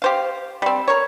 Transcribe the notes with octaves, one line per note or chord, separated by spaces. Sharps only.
G4 C5 F5
G3 C4
A#4 C#5